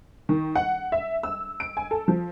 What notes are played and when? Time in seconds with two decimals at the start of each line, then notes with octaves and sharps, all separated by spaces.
0.29 D#3
0.55 F#5
0.92 E5
1.23 E6
1.60 D7
1.77 G#5
1.91 A4
2.08 F3